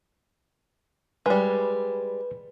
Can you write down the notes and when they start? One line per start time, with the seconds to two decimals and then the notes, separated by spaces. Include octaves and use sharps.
1.26 G3 G#3 B4